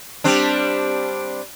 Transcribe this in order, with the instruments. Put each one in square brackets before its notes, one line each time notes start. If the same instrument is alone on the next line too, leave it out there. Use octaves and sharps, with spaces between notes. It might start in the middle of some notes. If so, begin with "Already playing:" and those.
[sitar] G3 C4 D4